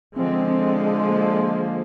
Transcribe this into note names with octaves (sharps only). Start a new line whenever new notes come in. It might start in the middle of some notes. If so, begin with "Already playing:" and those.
D3 F3 G#3 C4
C4
A#3